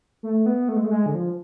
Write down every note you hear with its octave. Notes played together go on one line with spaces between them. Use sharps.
A3
B3
A3
G#3
A3
G#3
D3
F3